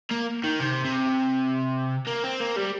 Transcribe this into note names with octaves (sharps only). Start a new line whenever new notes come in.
A#3
D#3
C3
C3
A#3
C4
A#3
G3